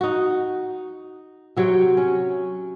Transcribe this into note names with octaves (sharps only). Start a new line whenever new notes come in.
D#4 F#4
C3 F#3 C#5 G5
C#4